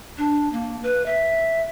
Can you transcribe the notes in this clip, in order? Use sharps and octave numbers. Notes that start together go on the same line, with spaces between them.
D4
A#3
B4
E5